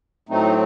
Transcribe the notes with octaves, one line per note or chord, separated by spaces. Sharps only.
A2 F#3 A3 C4 D#4